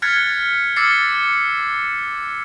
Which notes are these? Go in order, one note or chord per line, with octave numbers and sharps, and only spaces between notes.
F6 F#6 G#6 A6 B6 C#7
D6 E6 F6 A6 C7 C#7